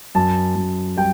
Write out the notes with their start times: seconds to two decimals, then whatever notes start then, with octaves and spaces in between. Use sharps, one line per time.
0.15 F#2 A5
0.56 F#2
0.97 G3 G5